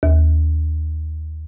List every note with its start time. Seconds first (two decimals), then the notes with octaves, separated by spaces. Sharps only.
0.03 D#2